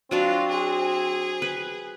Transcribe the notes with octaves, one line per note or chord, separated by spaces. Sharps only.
F#3 C4 D4 F4 F#4
G#4
B4